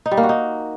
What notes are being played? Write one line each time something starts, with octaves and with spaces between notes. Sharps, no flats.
D#4
G3
A#3
F#4
D#4